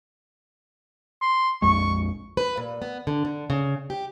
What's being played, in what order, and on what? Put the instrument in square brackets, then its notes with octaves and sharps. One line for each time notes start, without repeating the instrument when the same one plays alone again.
[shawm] C6
[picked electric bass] A#1 F2 G#3 [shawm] C#6
[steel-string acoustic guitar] B4
A#2
B3
D3
D3
C#3
G4